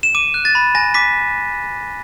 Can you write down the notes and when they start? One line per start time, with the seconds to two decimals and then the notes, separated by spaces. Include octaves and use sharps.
0.03 E7
0.15 D6 D#7
0.34 F#6
0.45 A6
0.55 B5
0.75 G#5 A#6
0.94 D6 B6